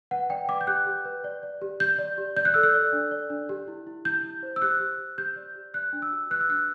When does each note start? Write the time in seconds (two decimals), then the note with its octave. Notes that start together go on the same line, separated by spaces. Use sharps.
0.11 B4 F#5
0.30 D5 G5
0.49 B4 D6
0.61 G6
0.67 G4 F#6
0.86 G4
1.05 B4
1.24 D5
1.43 D5
1.62 G4
1.80 G4 G6
1.99 D5
2.18 G4
2.36 D5 G6
2.45 F#6
2.54 A4 E6
2.63 F#6
2.74 D5
2.93 D4
3.11 D5
3.30 D4
3.49 G4
3.68 E4
3.87 E4
4.05 E4 G6
4.24 E4
4.43 C5
4.56 E6
4.62 G4 F#6
4.80 G4
4.99 G4
5.18 G4 G6
5.36 D5
5.55 G4
5.74 D5 F#6
5.93 D4
6.02 E6
6.12 F#4
6.30 B4 F#6
6.41 E6
6.49 D4 F#6